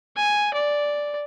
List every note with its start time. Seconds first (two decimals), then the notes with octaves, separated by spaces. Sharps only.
0.16 G#5
0.54 D5